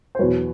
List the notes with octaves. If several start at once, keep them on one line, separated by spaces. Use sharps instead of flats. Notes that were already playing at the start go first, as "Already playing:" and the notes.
C5
E2 B2 F#3 B4 C#5